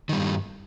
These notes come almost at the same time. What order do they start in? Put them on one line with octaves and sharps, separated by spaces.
D#3 G3 G2